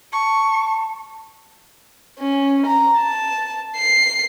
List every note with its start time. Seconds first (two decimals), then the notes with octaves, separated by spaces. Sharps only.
0.13 A5 C#6
2.19 C#4
2.67 A#5
2.98 A5
3.77 C7